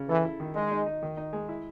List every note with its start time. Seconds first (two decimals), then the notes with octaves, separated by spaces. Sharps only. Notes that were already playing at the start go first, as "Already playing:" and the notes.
Already playing: C#3
0.09 E3 A4
0.25 E4
0.40 D#3
0.55 G#3 D#4
0.71 D#4
0.86 D#4
1.03 D#3
1.17 D#4
1.33 G#3
1.49 E4